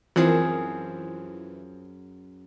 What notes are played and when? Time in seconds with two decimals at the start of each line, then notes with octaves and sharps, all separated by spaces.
0.16 F#2 E3 F3 C4 G#4 F#5